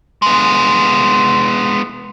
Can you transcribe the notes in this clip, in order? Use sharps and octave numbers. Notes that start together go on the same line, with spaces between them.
G#3 B3